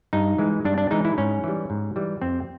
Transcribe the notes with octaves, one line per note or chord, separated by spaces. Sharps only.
G2 D#4
E3 G#3
G2 D4
D4
E3 G#3 D#4
E4
G#2 C#4
E3 G3
G#2
E3 G3
F2 C4